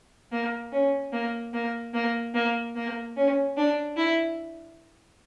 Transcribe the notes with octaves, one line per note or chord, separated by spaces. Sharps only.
A#3
C#4
A#3
A#3
A#3
A#3
A#3
C#4
D4
E4